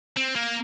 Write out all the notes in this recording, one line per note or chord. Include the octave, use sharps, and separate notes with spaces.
C4
A#3